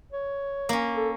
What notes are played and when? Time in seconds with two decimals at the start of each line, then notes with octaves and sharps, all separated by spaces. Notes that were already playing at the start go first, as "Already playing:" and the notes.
0.12 C#5
0.69 A#3 C#4
0.96 A4